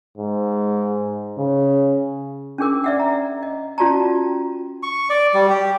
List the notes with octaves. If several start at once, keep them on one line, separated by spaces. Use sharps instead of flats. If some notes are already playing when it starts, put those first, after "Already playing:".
G#2
C#3
C#4 D4 G#4 A#4 D6
D5 E5 F#5
A#5
D#5
C#4 F4 F#4 D5 A5 A#5
C#6
D5
G3
G4